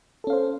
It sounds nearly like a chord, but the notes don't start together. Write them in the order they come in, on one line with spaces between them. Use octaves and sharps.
A4 C#4 F5 C5